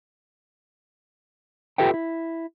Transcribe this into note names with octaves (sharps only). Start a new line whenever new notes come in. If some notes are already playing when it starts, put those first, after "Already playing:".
F4 G4 A4 B4 E5 G5
E4